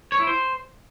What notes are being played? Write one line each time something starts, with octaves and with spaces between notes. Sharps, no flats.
C#5
E4
C5